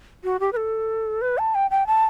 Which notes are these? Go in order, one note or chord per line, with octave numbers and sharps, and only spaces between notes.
F#4
G4
B4
A4
B4
A5
G5
G5
A5